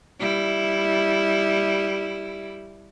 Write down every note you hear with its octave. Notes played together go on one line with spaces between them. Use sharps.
G3 E4